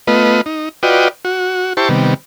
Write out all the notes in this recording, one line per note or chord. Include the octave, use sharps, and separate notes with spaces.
A3 B3 F4 B4 D#5
D#4
F4 F#4 B4 D5 D#5 G5
F#4
E4 G4 C5 A5 C#6
C3 D#3 G3 B3